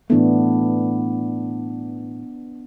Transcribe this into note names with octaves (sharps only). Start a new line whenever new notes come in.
A2 E3 A3 B3 D4